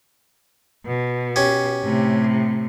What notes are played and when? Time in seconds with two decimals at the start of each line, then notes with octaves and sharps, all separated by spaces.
0.86 B2
1.36 C#4 G4
1.83 A2 C3